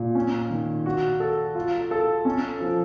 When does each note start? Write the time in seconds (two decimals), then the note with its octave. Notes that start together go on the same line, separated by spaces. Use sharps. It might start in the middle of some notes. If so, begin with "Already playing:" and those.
Already playing: A#2
0.15 C#4
0.50 D#3
0.86 F#4
1.20 A4
1.55 F4
1.91 A4
2.25 C#4
2.60 F3